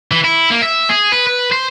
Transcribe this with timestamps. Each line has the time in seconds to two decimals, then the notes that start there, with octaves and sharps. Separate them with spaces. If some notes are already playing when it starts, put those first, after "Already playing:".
0.11 E3
0.24 E4
0.51 A#3
0.62 E5
0.89 G#4
1.12 B4
1.27 B4
1.52 C5